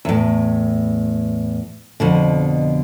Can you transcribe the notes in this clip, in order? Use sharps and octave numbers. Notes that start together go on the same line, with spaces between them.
E2 A2
F2 B2 D3